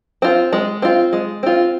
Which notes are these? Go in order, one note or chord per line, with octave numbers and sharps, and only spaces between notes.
C4 F4
G#3
C4 F4
G#3
C4 F4